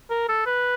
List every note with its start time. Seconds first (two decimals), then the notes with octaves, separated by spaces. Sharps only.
0.10 A#4
0.29 A4
0.46 B4